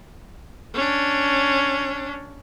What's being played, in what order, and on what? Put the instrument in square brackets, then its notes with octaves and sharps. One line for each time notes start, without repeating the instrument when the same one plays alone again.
[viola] C#4 D4